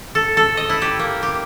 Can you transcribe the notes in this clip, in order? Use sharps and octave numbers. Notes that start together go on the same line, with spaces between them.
A4
A4
D#5
E4
G4
A#3
G4